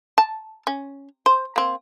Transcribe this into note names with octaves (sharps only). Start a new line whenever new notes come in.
A5
C#4
C5
A#3 C4